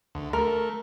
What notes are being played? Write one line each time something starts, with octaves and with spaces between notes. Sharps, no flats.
D2
A3 A#4